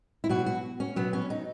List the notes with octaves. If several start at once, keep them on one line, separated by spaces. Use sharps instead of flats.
E4
B2 F#3 F#4
F#4
C#4
B2 F#3 B3
C#4
D#4